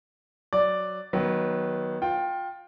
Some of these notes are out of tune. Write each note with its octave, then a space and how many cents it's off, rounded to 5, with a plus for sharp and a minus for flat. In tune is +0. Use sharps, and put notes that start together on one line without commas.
F#3 +0 D5 +0
D#3 +0 F#3 +0 B3 -25
F4 +20 G5 +0